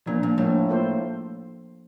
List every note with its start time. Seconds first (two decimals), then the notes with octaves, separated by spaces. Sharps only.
0.06 A#2 F3 A#3 D4
0.23 A#2
0.38 A2 F3 A#3 D4
0.69 A#3 F4 A4 C5